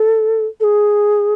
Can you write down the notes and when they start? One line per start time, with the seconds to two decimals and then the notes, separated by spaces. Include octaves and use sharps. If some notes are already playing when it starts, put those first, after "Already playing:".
Already playing: A4
0.60 A4
0.64 G#4